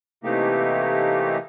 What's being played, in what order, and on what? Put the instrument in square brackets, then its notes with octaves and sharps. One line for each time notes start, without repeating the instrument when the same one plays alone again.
[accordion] C3 E3 A3 A#3 D#4 G4